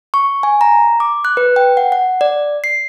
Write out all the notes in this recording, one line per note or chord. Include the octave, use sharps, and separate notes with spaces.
C#6
G#5
A#5
D6
F#6
B4
G5
F#5
F#5
D5
C7